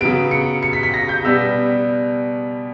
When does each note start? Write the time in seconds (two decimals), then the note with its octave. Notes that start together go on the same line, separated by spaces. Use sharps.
0.01 C#3 F#3 B3 D7
0.31 C#7
0.63 C#7
0.73 B6
0.83 B6
0.94 A#6
1.09 G6
1.24 B2 G3 B3 E6